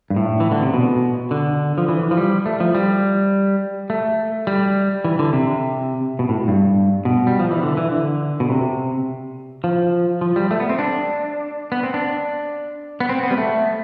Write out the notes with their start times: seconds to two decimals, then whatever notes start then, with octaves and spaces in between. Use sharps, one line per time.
0.10 G2
0.16 A2
0.40 E3
0.51 D3
0.62 C3
0.74 B2
1.31 D3
1.78 F3
1.88 E3
2.11 F3
2.17 G3
2.46 A3
2.60 F3
2.75 G3
3.90 A3
4.47 G3
5.05 E3
5.19 D3
5.33 C3
6.19 B2
6.29 A2
6.48 G2
7.05 B2
7.27 G3
7.39 F3
7.51 E3
7.63 D3
7.77 E3
7.92 D3
8.40 B2
8.49 C3
9.64 F3
10.21 F3
10.36 G3
10.51 A3
10.60 B3
10.69 C4
10.79 D4
11.72 B3
11.83 C4
11.94 D4
13.00 B3
13.09 C4
13.23 B3
13.31 G3
13.38 A3